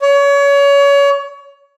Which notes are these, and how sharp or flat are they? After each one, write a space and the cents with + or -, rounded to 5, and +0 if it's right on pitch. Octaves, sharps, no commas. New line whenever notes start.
C#5 +30